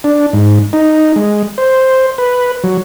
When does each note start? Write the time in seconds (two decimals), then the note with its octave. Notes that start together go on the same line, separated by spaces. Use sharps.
0.04 D4
0.33 G#2
0.73 D#4
1.16 G#3
1.58 C5
2.18 B4
2.64 F#3